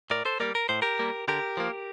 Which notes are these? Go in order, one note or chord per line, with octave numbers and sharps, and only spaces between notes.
A2 A#4 D5
A4 C5
G3 A#3 A#4 D5
A#4
A2 C5
G4 A#4
G3 A#3
D3 G4 A#4
F3 A#3